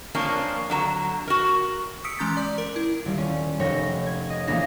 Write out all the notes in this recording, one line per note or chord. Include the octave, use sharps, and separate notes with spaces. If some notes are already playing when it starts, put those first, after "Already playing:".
F3 A#3 C#4 D4
D3 F#3 A#5
F#4 A#4
D#6 E6 B6 C#7 D7
E3 G#3 C#4 A#5 G6 A6
D5 D6
A#4
E4
D#1 G3
C#4
F1 C#5 G5 A#6
G#6
D#5
A#1 E3 A#3 B3 D4 A#6